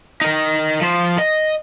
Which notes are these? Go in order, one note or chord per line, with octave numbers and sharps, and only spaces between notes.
D#4 A#4
F3 C5
D#5